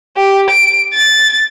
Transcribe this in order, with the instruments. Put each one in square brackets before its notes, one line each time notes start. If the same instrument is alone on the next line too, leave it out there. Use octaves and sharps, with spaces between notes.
[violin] G4
D7
A6